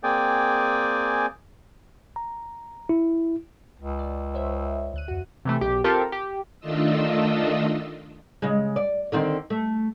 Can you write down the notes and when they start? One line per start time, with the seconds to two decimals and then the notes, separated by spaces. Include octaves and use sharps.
0.03 A#3 C4 G#4 D5 G5 G#5
2.16 A#5
2.89 E4
3.80 C#2
3.99 D5
4.34 C5 C#5 E5
4.94 D2 F#6 D#7
5.08 F2 F#4
5.45 C3 E3 A3
5.61 B1 G4
5.84 C4 F4 G4 A4 A#4
6.12 G4
6.60 D#3 A3 D4 F4 D#5 E6
8.42 C#3 G#3
8.76 D5
9.12 D3 D#3 C4
9.50 A3